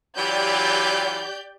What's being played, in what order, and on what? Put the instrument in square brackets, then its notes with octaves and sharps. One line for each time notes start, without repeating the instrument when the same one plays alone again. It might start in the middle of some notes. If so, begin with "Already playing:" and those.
[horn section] E3 F#3 F4 [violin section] G4 D5 G6